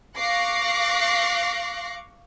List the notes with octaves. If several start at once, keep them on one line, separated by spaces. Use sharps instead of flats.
F5 C#6 D6 F#6 A#6 C7